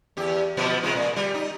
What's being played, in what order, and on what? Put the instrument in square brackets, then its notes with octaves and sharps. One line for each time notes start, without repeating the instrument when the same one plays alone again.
[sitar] E2 G4
B2 F3 B3
C3 G#3 F4
A#2
G3
D#4